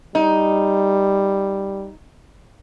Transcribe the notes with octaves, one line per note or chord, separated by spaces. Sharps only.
G3 D#4